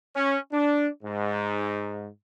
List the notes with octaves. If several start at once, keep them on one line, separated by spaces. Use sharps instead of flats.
C#4
D4
G#2